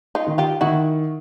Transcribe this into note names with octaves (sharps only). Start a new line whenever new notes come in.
D#4 F4
D#3
F4 G4
D#3 E4 F#4